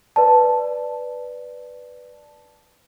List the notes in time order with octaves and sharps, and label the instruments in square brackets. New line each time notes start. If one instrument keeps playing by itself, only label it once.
[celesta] B4 D5 A5